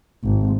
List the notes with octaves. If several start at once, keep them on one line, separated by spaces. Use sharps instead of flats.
G#1